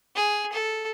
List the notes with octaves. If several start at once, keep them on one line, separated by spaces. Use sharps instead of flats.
G#4
A4